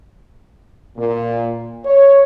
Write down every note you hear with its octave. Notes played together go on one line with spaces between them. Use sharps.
A#2
C#5